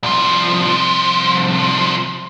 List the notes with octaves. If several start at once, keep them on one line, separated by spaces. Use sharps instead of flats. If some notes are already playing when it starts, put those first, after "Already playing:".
C2 F3